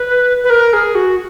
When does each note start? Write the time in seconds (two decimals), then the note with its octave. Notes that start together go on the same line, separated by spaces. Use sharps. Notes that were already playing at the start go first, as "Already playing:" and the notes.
Already playing: B4
0.44 B4
0.50 A#4
0.73 G#4
0.95 F#4